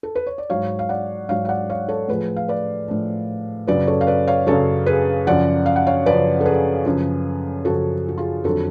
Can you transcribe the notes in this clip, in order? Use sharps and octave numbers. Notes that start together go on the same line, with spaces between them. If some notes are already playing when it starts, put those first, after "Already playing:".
A4
B4
C#5
D5
G#2 F#3 C#5 F5
F5
D5 F#5
G#2 F#3 C#5 F5
F5
D5 F#5
C#5 F5
A4 C#5
A2 F3 G#4 B4
F5
B4 D5
A2 F3
F#2 C#3 F#3 B4 D5
A4 C#5
F5
B4 D5
C#5 F5
F#2 C#3 F#3 A4 C#5
G#4 B4
F#2 C#3 F3 D5 F#5
F5
F#5
C#5 F5
F#2 C#3 F3 B4 D5
A4
G#4 B4
F#2 C#3 F3
F#2 C#3 F3 F#4 A4
F#4
F4 G#4
F2 D3 F#3 F#4 A4